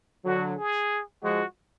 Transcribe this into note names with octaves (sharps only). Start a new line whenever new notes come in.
D3 F#3 F#4
G#4
F3 G#3 F#4